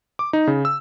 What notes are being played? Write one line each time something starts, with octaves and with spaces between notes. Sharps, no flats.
D6
D#4
C#3
E6